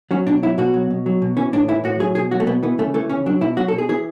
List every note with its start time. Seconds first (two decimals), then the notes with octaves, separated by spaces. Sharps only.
0.11 F#3 C#4
0.26 B2 D4
0.43 F#3 E4
0.58 B2 F#4
0.74 F#3
0.90 B2
1.06 F#3
1.22 B2
1.37 E3 C#4
1.53 A2 D4
1.68 E3 E4
1.84 A2 F#4
1.99 F#3 G#4
2.15 B2 G#4
2.31 F#3 F#4
2.40 A3
2.47 B2 B3
2.63 E3 B3
2.78 C#3 A3
2.94 E3 A3
3.09 C#3 C#4
3.26 F#3 D4
3.41 B2 E4
3.57 F#3 F#4
3.68 A4
3.73 B2
3.78 G#4
3.89 E3 G#4